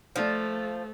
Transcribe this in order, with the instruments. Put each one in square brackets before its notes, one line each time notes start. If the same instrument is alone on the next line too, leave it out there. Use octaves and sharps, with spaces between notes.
[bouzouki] F3 [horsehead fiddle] A3